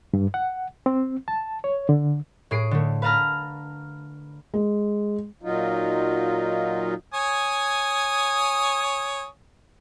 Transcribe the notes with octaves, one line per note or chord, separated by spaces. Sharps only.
G2
F#5
C4
A5
C#5
D3
A2 G#4 C7 D7
D3 A3
B4 F5 A5 A#5 F6
G#3
A#2 F#3 D#4 F4
C#5 G#5 D#6